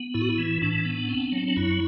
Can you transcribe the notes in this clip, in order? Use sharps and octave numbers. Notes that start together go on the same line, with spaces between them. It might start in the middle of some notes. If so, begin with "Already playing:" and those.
Already playing: B3
A2 E4
F#4
E4
E3
A2 D4
B3
C4
F#3
D4
F#2 E4